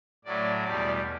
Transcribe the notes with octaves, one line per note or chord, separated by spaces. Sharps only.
A2 F#3 A3 D5
E2 B2 G3 D5